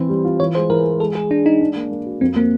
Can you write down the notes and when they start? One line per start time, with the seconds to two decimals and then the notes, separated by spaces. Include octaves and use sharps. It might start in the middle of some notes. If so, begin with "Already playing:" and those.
Already playing: E3 C4 C5
0.09 G3
0.25 F4
0.40 E3 C#5
0.55 G#3 C5
0.70 E3 A#4
0.84 G#3
1.00 G#3 A4
1.15 G#3 G#4
1.30 G#3 D4
1.46 G#3 D#4
1.61 D4
1.76 A#3
1.91 A#3
2.06 F#4
2.21 F2 C4
2.36 A#3 C4